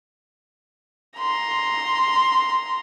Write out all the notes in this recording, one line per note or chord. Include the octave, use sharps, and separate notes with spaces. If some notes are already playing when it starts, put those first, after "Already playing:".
A#5 C6